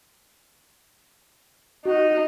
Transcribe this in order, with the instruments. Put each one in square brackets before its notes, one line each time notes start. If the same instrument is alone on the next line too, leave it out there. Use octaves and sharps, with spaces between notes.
[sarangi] D#4 [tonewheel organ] F#4